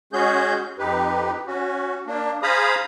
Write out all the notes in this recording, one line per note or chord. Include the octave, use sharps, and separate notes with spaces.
G#3 C#4 F#4 G#4 G6
F2 D#4 G4 B4
C#4 F#4
A#3 D4
G#4 C5 F5 A#5 B5 D#6